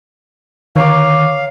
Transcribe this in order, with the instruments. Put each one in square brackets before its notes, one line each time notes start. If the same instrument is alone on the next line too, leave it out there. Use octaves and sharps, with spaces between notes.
[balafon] D3 [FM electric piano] D#3 [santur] C#5 A#5 D6 [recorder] F5